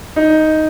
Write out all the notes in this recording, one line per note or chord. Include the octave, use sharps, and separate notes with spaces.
D#4